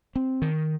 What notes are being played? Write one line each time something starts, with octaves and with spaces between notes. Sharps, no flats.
C4
D#3